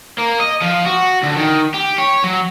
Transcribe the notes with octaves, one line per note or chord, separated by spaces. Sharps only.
A#3
D#5
F3
F#4
D2
D#3
G4
C#5
F#3